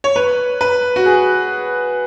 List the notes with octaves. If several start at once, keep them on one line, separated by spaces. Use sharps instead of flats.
C#5
B4
B4
F#4
G#4